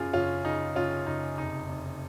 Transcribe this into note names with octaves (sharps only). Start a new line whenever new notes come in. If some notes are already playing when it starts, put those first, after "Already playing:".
Already playing: F#2 C#3 F4 G#4
F#1 C#4 F4
C#3 D#4
F#1 C#4 F4
F#1 D#4
F1 D#4
F1